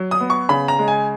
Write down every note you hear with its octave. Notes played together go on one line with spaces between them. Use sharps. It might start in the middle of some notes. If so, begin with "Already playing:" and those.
Already playing: F#3
D#6
B3
C#6
C#3 B5
A#5
G#3
G#5